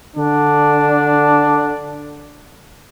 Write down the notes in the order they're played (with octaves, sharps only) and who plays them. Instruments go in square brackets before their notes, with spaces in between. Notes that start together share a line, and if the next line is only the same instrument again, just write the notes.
[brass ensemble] D3 D4